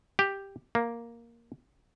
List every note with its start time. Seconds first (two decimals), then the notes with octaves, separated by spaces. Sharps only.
0.19 G4
0.75 A#3